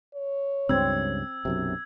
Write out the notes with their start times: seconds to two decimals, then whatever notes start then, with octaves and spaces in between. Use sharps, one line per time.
0.15 C#5
0.69 C#2 G2 C4 E6 G#6
1.45 B1 F#2 C3